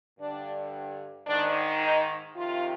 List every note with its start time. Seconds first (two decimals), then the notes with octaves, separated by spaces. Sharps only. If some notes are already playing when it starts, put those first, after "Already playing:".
0.19 G2 D3 D4
1.27 G#2 D#3 D4
1.81 D#4
2.35 F2 C3 D#3 F4